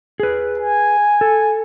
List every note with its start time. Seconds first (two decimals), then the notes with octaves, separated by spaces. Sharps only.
0.20 G#4 B4
0.58 G#5
1.21 A4